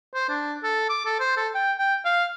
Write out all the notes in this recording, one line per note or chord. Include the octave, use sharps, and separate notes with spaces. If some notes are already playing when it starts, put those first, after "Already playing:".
C5
D4
A4
D6
A4
C5
A4
G5
G5
F5